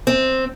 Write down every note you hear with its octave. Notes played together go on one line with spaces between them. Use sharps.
C4